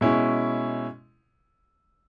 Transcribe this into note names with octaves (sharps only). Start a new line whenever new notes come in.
B2 G#3 C#4 E4